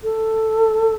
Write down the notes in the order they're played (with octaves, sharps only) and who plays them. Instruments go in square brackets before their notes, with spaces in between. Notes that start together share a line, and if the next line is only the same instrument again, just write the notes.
[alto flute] A4